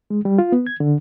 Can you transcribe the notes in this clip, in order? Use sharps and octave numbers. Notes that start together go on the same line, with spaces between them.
G#3
G3
F4
B3
G#6
D3